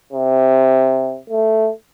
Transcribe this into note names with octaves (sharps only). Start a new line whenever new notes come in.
C3
A3